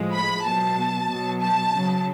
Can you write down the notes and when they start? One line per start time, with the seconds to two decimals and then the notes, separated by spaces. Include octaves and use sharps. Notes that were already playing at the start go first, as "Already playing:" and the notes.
Already playing: A2 F3 G#3
0.14 B5
0.45 B2 F#3 A5
1.09 B2 F#3
1.41 A5
1.73 C#3 F#3